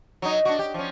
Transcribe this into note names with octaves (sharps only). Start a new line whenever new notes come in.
F#3 D#4
D4 F#4
G4
F3 C#4